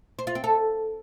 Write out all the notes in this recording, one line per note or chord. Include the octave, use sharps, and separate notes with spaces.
C5
F4
C4
A4